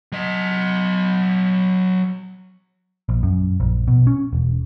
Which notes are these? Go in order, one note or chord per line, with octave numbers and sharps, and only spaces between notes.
F#3 D#5
A#1
F#2
A#1
B2
C#4
E1